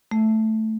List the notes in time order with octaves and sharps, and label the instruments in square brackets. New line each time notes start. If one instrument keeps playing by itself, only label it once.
[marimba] A3